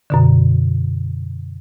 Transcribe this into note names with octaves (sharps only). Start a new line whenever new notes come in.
F#2 B2 D3